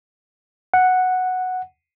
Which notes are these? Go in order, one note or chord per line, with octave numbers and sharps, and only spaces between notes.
F#5